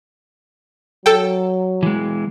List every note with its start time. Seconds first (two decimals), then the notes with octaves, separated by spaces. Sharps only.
1.06 F#3 A4 G5
1.83 E3 G#3